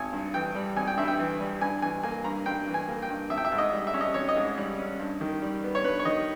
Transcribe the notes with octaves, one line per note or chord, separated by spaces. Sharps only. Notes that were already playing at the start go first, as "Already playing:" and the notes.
Already playing: G#1 G#5
G2
E3 G5
G3
G#1 G#5
G5
G2 E5
G5
E3
G3
G2 G#5
E3 G#5
A#3 G#5
G2 A#5
G2 G5
E3
G#5
A#3
G5
G2
G#1 E5
G5
E5
G#2
D#5
G3
E5
C#4
D#5
G#1 C#5
D#5
G#2
G3
C#4
G2
D#3
G3
B3
C#5
G2 B4
C#5
D#3 D#5